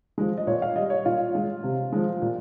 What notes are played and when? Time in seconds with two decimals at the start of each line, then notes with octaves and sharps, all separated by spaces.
0.18 F3 G#3
0.38 D#5
0.47 A#2 C#5
0.62 F5
0.76 G3 D#5
0.90 C#5
1.05 A#2 F4
1.35 G#3
1.63 C3
1.93 F3 G#3
2.22 A#2